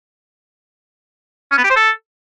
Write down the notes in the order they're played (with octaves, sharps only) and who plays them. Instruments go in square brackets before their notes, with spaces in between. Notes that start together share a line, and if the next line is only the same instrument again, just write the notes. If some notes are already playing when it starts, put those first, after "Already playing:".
[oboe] C#4
B3
G4
C5
A4